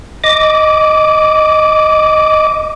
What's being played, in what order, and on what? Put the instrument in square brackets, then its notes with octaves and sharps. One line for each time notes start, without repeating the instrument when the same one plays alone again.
[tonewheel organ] D#5 D6